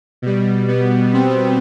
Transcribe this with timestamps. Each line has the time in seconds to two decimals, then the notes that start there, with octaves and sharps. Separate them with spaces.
0.22 B2 G3
0.68 B3
1.13 C4